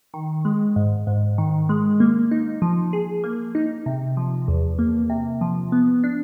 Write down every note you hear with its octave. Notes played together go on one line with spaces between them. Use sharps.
D#3
G#3
G#2
G#2
D#3
G#3
A#3
D#4
F3
G#4
A#3
D#4
C3
F3
E2
A#3
C3
F3
B3
D4